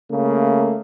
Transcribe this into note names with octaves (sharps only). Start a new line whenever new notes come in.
C#3 A3 A#3